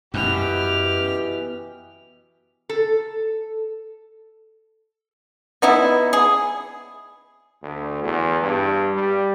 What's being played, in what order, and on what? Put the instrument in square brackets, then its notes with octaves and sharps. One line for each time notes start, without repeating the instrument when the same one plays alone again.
[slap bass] F#2 [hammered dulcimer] B2 E3 [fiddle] G4 F6
[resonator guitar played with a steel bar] A4
[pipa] B3 D#4 E4
G#4
[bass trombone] D2
E2
G2
G3